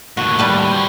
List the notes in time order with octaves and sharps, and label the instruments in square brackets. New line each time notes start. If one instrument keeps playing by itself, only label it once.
[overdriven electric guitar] D#2 A2 [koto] F#4
[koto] G3 B4 A5
[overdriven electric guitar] F#4 C5